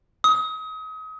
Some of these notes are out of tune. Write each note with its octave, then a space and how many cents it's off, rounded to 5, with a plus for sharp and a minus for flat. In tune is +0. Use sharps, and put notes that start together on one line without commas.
D#6 +35